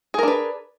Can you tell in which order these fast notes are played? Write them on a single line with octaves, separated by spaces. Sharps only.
G#4 A#4 D4 B4